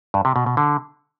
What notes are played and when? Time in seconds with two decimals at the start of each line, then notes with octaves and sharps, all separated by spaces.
0.14 G2
0.25 C3
0.36 B2
0.46 B2
0.57 D3